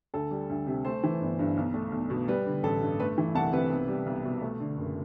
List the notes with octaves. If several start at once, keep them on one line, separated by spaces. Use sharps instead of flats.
D2 A4
G3
D2
C3
A3 A4 C5
E3
G1
G2
B1
A3
B1
B2
G3 B4
D3
A1 A4
G2
A3 B4
E3
C2 F#5 A5
C3 B4
B1
G3
B1
B2
A3
D3
F#1